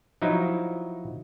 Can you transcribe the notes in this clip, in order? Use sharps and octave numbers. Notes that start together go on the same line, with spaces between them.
F3 F#3 D#4 E4